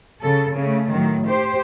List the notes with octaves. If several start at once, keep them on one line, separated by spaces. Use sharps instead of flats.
C#3 A4
C#3 A3
A2 D#3 F#3
G4 C5